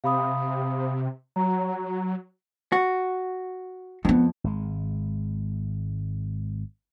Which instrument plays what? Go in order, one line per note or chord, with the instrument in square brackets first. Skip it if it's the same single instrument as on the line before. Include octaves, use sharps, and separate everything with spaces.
[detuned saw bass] C3 [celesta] F5 B5 D#6
[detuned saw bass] F#3 [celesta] A#5
[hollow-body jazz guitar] F#4
[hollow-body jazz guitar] F2 [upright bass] B3 C4
[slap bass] G#1 G#3